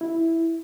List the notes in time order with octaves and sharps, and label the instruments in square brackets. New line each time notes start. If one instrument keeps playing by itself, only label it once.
[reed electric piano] E4